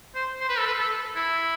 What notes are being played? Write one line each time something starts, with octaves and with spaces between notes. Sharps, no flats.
C5
C5
B4
A4
B4
A4
E4